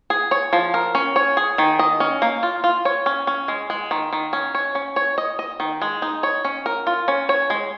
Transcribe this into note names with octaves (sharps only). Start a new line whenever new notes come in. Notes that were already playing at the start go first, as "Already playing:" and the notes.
G#4
C#5
F3
A#4
C#4
C#5
G#4
D#3
D#5
C#4
A#3
F4
F4
C#5
C#4
C#4
G#3
G#3
D#3
D#3
C#4
C#5
C#4
C#5
D#5
D#5
D#3
G#3
D#4
C#5
C#4
A#4
F4
C#4
C#5
G#3